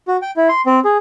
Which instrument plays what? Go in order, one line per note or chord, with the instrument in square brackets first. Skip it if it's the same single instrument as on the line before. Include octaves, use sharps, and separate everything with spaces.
[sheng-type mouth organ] F#4
G5
E4
C6
C4
G#4